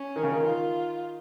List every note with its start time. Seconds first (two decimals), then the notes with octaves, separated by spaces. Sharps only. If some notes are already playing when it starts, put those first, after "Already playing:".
Already playing: C#4
0.16 D#3
0.23 C#3
0.32 D#3
0.43 D#3 F4